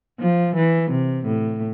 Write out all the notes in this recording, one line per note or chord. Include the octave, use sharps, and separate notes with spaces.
F3
E3
C3
A2